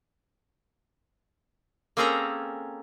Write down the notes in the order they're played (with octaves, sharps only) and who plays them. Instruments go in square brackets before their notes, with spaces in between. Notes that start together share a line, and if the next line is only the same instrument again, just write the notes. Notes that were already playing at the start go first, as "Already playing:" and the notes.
[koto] A#3 C4 C#4 G#4 A4 A#5